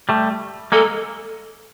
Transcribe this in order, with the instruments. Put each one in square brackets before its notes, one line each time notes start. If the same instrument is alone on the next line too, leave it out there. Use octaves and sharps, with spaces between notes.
[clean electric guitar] G3 A3
[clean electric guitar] G#3 A#3 [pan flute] A4